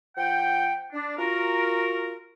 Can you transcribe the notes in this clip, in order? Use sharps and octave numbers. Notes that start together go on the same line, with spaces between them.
F3 F#5 G5
D4
F4 F#4 A#4